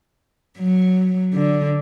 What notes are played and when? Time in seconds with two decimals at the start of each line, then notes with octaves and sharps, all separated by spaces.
0.58 F#3
1.34 D3